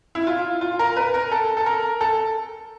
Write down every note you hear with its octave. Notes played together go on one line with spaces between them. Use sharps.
E4
F4
F4
A#4
B4
A#4
A4
A4
A#4
A4